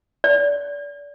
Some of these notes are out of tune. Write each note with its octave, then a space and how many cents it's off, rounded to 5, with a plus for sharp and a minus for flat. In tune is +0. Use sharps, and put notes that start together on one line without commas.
D5 -30